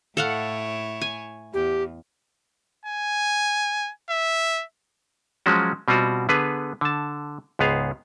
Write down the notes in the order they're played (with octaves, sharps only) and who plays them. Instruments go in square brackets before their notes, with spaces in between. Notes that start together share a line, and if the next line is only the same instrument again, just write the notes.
[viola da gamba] A2 E4 C#5 [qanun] A4 F5 F#5
[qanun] G#5
[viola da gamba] E2 [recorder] G4
[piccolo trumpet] G#5
E5
[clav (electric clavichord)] F3 F#3 G#3 C#4 F#4
B2 G3 C4 F4 F#4
D3 B3 G#4 B4
D3 A5
C#2 G#2 B3 G#4 F5